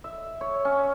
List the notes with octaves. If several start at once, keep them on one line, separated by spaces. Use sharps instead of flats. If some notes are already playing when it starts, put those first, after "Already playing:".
E5
C#5
C#4